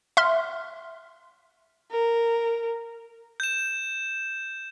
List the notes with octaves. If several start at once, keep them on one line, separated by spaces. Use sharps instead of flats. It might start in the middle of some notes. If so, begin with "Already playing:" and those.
E5 C6 F6
A#4
G6 E7